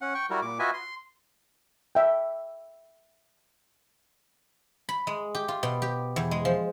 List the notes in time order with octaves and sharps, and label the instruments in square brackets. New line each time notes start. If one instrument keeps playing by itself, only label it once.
[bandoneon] C#4 F#5
G5 C#6
G3 E4 F#4 A#4
A#2 D6
F4 F#4 B4 D#5 E5 G#5
C6
[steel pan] E5 G5
[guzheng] B5
G#3
G4
F4
B2
G4
E2
G#3
F3